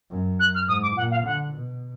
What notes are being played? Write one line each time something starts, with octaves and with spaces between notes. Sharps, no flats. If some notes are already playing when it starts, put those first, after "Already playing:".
F#2
F#6
F6
G#2 D#6
D6
A#2 F#5
F5
D3 F#5
B2